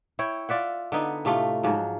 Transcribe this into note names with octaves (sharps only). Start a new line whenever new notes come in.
E4 C#5 G5
F4 D5 E5 F#5
D3 B3 D#4
A2 C3 A3 F4
G#2 F3 F#3